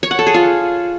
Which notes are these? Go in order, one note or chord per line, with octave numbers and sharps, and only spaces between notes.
C#5
F#5
A4
G#4
F4